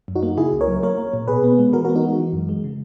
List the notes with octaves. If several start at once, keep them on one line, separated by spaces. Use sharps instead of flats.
F#2
D#4 F#4
A#3
C#3 E4 G#4
C#2
A#4 C#5
F#3
A#3 A#4 C#5
A#3
A#2
B2 G#4 B4
B3
G#3
E3 F#4 A#4
F#4 A#4
B3
D#4 F#4
G#3
E3
F#2
G#3
C#3